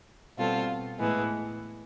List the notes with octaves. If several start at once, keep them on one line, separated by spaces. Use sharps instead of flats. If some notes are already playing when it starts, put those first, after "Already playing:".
B2 G3 C4 F4 A4
A2 E3 G#3 B3